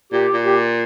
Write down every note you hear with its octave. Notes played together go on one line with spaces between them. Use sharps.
A#2 G4
A#2
G4